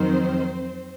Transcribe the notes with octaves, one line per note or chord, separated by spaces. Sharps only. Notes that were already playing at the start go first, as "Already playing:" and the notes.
Already playing: F2 D#3 F#3 C4 C5